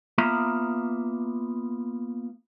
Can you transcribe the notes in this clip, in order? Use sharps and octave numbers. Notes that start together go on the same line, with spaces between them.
A#3 B3 F4 E5 A#5